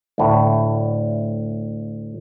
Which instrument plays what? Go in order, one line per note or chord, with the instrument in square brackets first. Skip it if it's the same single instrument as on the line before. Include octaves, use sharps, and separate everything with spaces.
[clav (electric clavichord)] D2 A2